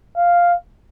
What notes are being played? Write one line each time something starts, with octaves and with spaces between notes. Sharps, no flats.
F5